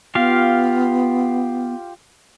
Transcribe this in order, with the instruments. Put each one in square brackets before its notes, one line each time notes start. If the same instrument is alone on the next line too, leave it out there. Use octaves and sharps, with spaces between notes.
[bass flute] B3 [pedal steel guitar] F4 G4 F5